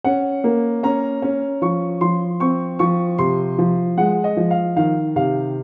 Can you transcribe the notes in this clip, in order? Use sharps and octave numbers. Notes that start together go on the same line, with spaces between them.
C#4 F#5
A#3
C#4 A#5
C#4
F3 C#6
F3 C6
C4 C#6
F3 C#6
C3 C6
F3
G#3 F#5
D#5
F3
F5
D#3 F5
C3 F5